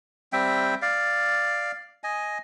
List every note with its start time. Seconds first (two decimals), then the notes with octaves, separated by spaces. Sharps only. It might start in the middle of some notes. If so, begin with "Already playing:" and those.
0.33 G3 C4 E5 G5
0.82 D5 F5
2.04 D#5 G#5